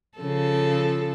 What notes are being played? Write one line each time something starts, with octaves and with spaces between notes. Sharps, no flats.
C#3 F3 A4